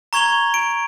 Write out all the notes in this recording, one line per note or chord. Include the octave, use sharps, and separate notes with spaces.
A#5 C#6 G#6 F7 G7
D7